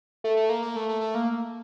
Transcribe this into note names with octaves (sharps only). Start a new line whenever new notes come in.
A3
A3
A#3
A#3
A3
A3
A3
A#3